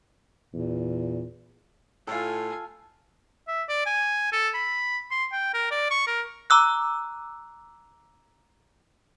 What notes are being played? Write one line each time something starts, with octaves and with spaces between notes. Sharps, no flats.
E2 A#2
A2 F4 A4 F5 G#5
E5
D5
G#5
A4
B5
C6
G5
A#4
D5
C#6
A#4
A#5 D6 E6 F#6